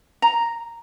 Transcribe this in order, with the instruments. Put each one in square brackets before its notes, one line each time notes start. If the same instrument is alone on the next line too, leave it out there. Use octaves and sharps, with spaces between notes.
[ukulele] A#5